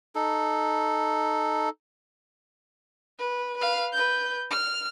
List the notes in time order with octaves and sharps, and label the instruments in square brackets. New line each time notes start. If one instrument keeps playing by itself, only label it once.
[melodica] D#4 A4
[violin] B4
B4 F5
B4 G6
F6